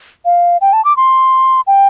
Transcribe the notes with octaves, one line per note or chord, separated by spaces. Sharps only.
F5
G5
A5
D6
C6
G5